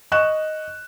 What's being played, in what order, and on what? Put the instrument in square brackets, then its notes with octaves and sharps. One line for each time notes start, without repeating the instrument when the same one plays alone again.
[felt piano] D#5 C#6 F#6 E7